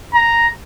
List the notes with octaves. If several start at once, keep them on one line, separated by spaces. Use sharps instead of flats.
A#5